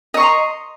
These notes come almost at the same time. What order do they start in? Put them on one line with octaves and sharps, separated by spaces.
D#5 C#6 C6 A#5